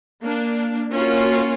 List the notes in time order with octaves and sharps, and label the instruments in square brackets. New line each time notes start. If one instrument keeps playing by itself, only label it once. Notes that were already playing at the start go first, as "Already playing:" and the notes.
[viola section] A#3 D4
A#3 C#4 F4 F#4